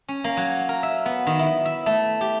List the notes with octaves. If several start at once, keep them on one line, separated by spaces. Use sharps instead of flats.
C#4
A#3
F#3
A#4
E5
B3
D#3
E4
E5
A3
G4